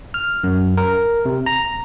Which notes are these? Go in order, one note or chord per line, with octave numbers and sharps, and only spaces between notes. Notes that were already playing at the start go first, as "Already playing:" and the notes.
F6
F#2
A#4
C3
A#5